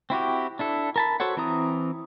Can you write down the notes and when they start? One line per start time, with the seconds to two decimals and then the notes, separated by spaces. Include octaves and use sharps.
0.10 C4 E4 F#4 G4
0.59 D4 E4 A4
0.96 A#4 A5 B5
1.20 F#4 A4 C5 C#5 F#5
1.37 E3 C4 E4 A#5 D#6